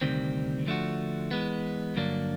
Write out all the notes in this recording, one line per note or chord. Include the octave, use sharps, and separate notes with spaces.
D2 C3 D#3 G3 C4
D3 F3 A3 D4 F#4
E3 G#3 B3
G2 D3 F#3 A#3 D4